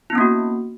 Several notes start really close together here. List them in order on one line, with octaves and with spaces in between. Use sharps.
E4 B3 C#4 A#3 F#4